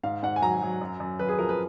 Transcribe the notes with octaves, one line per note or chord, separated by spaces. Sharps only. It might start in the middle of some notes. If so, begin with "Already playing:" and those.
G#2 F5
G#2 F#5
G#5
F#3 A#5
F#3
F#2
F#2
F#2 B4
G#4
F3 A#4
B4